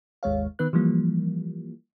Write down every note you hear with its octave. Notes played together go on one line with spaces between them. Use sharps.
G#1 D#2 G#3 C#5 F5
D#3 B3 B4 F#6
E3 F3 G3 A#3